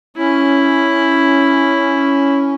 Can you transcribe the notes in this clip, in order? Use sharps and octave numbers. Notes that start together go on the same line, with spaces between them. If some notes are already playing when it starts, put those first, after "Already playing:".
C#4 E4